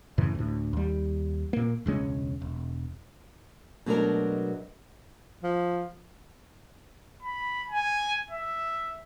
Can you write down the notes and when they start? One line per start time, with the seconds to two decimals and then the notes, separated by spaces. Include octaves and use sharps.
0.18 F#2 A2 C#3 E3
0.35 D2 A2
0.73 D#2 G3
1.53 A#2 A#3
1.86 E1 C#2 G#3 C#4
2.42 E1
3.86 B2 F#3 G#3 A3 D4 A#4
5.44 F3
7.23 B5
7.70 G#5
8.31 E5